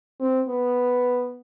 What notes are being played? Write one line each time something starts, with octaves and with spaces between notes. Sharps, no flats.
C4
B3